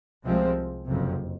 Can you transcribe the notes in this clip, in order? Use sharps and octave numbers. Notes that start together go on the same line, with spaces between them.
C2 C3 F3 G#3 C4
F#1 F2 C3